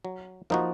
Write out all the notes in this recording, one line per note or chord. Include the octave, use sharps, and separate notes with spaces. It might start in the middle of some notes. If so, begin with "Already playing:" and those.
F#3
F3 A#3 D#4 F#4